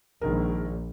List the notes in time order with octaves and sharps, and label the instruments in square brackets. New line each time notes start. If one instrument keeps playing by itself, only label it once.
[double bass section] A#1 [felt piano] D#3 G#3 A#4